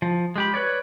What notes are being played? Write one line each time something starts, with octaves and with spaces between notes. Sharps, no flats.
F3
G#3 G4 B5
B4 C#5 D5